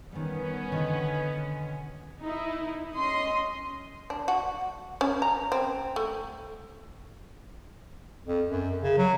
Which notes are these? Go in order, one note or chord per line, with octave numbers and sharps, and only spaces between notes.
D#3 G3 B3 C#4
B2 D3 D#3
D#4 E4
C#4 D#5 C6
D4
F#4
C#4
A#5
C4
A3
F2
F#2
C#3
F#3